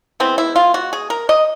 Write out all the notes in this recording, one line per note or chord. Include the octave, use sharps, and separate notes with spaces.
E3 G#3 B3 C4
E4
F4
F#4
G#4
A#4
D#5